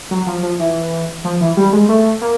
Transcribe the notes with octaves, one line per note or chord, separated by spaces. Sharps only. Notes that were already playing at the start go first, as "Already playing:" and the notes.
F#3
F3
F3
E3
F3
E3
G3
G#3
A3
A#3